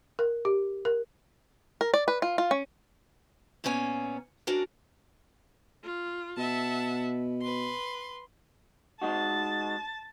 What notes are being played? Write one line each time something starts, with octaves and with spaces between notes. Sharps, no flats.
A#4
G4
A#4
A#4
D5
B4
F4
F4
C#4
A#2 A#3 B3 C#4 G#5
C#4 D4 F#4 A#4
F4
B2 E5 F#5 A5
B4 C6
G#3 D#4 F#4 A5